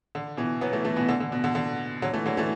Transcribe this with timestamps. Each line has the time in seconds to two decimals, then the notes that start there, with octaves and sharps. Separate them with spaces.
0.15 D3
0.37 B2 E3
0.61 F#3 B3
0.73 E3 A3
0.84 E3 A3
0.96 B2 E3
1.09 D3
1.20 D3
1.32 B2
1.44 D3
1.55 D3
2.02 D3 F#3
2.14 E3 A3
2.26 D3 F#3
2.37 E3 A3